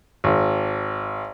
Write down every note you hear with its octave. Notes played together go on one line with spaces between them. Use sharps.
G#1